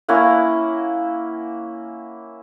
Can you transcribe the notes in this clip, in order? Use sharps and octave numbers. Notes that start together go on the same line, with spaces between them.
A#3 C#4 E4 F#5